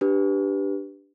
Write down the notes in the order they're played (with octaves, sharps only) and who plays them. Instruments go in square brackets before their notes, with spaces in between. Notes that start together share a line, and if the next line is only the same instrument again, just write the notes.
[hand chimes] D4 G4 B4